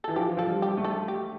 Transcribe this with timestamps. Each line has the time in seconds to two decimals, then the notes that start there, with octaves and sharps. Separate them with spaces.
0.04 E3 A4
0.16 F3 G4
0.37 F3 A4
0.47 G3
0.62 G4
0.78 A3
0.84 A4
1.08 G4